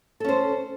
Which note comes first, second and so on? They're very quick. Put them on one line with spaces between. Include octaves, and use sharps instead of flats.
A4 C#4 C5